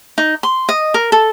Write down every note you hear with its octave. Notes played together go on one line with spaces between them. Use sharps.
D#4
C6
D#5
A#4
A4